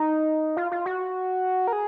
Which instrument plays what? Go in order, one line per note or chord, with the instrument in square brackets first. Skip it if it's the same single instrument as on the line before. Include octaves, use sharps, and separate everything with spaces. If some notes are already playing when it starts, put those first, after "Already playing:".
Already playing: [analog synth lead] D#4
F4
F4
F#4
A#4
G#4